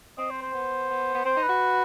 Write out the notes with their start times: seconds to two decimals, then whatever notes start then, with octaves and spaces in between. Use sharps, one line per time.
0.18 C4 D#5
0.31 C5
0.42 C5
0.53 B3
0.90 B3
1.15 B3
1.25 C4 C5
1.37 D#4
1.43 B4
1.49 F#4